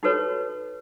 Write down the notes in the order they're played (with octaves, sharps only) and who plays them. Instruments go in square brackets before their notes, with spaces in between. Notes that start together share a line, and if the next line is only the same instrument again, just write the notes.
[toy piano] D#4 F#4 G4 A4 B4 C#5